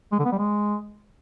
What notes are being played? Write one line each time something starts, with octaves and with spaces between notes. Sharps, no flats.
G#3
D3
B3
G3
G#3